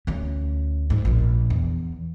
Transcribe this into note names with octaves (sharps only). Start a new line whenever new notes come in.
D2 C#4
G#2
A#1 A#2
E2